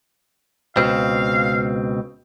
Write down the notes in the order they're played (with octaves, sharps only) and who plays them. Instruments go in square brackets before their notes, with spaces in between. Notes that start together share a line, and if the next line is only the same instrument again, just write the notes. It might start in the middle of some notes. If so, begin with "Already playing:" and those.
[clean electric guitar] C#2 B2 C4 [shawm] F5